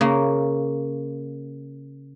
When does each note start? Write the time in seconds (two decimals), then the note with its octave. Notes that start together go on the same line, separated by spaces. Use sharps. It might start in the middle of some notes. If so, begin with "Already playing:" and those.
0.01 C#3 A#3